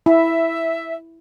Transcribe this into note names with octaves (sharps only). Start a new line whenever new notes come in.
E4 E5